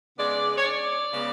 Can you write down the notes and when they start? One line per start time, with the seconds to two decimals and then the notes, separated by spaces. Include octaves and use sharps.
0.18 C#3 G#3 B3 D5
0.57 C#5
0.65 D5
1.12 C#3 G#3 B3